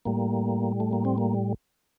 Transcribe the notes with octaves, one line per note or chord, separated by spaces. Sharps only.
A2 G3 A#3
A3
A#3
C4
A#3